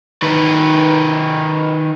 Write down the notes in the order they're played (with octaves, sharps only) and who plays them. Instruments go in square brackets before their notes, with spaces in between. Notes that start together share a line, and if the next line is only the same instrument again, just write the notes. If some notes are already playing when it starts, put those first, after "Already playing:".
[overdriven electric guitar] D#3 B4